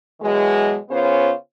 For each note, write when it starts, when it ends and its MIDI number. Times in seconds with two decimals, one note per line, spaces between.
0.21 0.75 47
0.21 0.75 52
0.21 0.75 54
0.21 0.75 56
0.90 1.32 49
0.90 1.32 59
0.90 1.32 61
0.90 1.32 65
0.90 1.32 72
0.90 1.32 73